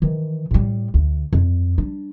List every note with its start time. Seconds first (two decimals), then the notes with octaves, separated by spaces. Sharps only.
0.02 D#3 E3
0.51 A2 G3
0.94 D2
1.33 F2
1.78 G3 D4